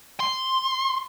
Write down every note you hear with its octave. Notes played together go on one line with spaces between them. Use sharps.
C6